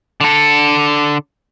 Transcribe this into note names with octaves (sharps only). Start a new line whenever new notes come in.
D3 A4